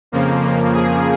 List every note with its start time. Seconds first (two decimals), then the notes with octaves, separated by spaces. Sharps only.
0.12 F2 C#3 F3 A#3
0.42 A#3
0.73 G#4